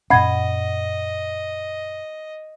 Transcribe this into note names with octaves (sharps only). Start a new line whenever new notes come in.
F#2 A#2 C#4 D#5 F#5 B5 G#6